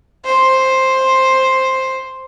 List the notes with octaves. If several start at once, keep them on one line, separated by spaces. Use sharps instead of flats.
C5